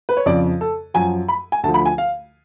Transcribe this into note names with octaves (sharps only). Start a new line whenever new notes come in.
B4
C#5
F2 C#3 F3 D5
A4
F#2 F3 G#5
B5
G#5
D2 D3 F3 A5
B5
G#5
F5